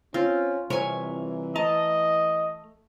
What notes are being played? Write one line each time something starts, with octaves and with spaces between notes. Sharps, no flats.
C4 C#4 F4
C2 C3 E3 A#4 C#5 G#5
A3 D#5 A5 A#5